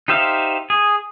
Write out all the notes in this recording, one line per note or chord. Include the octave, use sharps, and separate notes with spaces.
D#4 G4 C5 E5 F5
G#4